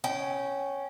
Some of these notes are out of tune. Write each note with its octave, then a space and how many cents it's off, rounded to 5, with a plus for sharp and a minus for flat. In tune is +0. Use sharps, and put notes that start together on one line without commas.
C#4 +0 G5 -20